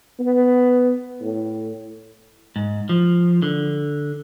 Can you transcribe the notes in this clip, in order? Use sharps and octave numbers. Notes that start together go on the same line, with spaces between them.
B3
A2
G#2
F3
D3